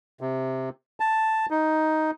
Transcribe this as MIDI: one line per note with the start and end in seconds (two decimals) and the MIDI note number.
0.21 0.69 48
1.00 1.46 81
1.50 2.11 63